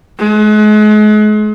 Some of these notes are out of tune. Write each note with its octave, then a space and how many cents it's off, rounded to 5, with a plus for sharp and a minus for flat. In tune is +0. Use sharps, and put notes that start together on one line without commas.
G#3 +40